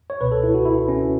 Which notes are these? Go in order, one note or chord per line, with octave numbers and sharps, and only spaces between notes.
C#5
C#2 B2 B4
A4
E4
F#4
E4
C#4